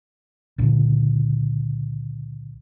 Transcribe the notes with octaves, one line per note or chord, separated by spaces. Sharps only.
C#2 A#2 D3